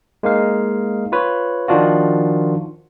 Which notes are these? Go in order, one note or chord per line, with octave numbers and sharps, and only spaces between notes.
G#3 A#3 D#4 F5
F4 B4 C#5
D#3 F3 D4 F4 F#4